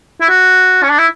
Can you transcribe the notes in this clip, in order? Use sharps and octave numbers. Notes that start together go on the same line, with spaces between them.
E4
F#4
C#4
D4
E4